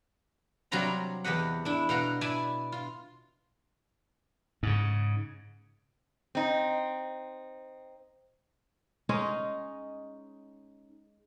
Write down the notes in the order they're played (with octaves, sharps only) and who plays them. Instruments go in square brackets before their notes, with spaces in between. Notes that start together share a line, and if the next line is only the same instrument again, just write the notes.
[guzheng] C3 F#3 G3 F4 A#5 B5
E2 E3 G4 D#5 F#5
D4 E4
B2 F5 F#5 A#5
E4 D5 G#5 A5
F4
[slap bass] G#2 C#3
[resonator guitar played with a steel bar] C4 D#4
[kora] G#3 C#4 D#4 G#4